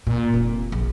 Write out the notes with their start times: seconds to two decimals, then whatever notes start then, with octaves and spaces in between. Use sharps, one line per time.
0.07 A#2
0.34 F1
0.72 A#1